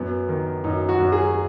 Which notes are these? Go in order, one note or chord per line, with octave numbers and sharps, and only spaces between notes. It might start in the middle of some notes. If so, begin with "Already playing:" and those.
Already playing: F#2 B3
D#3
F#2 D#4
F#4
F#2
G#4